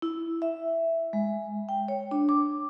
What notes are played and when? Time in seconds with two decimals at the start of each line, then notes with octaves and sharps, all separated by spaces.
0.02 E4
0.42 E5
1.13 G#3
1.69 G5
1.88 C#5
2.11 D4
2.29 D6